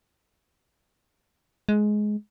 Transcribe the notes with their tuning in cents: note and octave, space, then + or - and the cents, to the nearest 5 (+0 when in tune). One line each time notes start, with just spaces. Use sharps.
G#3 +15